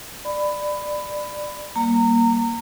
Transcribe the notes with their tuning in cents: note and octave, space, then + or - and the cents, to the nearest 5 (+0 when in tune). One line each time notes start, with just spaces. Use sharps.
D5 +15 B5 +15
G3 -15 A#3 +0 A#5 -25